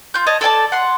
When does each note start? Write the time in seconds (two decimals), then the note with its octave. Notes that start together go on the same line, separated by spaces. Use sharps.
0.14 F4 G6
0.27 C#5 D#5 A5
0.41 A4 D5 G#5 A5
0.72 F#5 C6